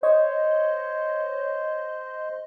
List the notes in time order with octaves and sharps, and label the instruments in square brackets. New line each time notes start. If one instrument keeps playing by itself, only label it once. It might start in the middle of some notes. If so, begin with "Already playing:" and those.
[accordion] C5 [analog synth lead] C#5 [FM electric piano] D#5